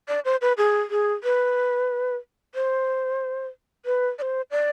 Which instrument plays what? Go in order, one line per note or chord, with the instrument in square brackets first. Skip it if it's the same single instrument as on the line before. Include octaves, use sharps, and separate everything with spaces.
[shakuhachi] D5
C5
B4
G#4
G#4
B4
C5
B4
D5
C5
D5